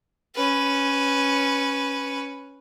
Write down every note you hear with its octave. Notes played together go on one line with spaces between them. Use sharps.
C#4 B4